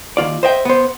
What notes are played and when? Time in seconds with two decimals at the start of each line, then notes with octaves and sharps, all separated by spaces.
0.17 D#2 F4 D5
0.43 C5 D#5 E5 G5
0.65 B3 C5